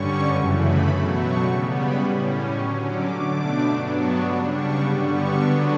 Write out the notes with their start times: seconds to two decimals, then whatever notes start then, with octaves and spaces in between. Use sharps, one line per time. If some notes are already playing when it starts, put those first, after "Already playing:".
Already playing: G2 D3 G3 C#4 C#6
0.25 F#2 C#3 E3 A3
0.53 B5
0.82 B2 F#3 A3 B5
1.10 C#6
1.38 C#3 G3 B3 C#6
1.67 B5
1.95 A2 G3 C#4 C#6
2.52 D3 F#3 C#4 C#6
2.80 D6
3.08 B2 A3 D4 D6
3.66 G2 F#3 B3 D4
3.94 C#6
4.22 C#3 G3 D4 B5
4.51 C#6
4.79 G2 D3 G3 B3 D6
5.07 C#6
5.36 D3 F#3 B3 D4 C#6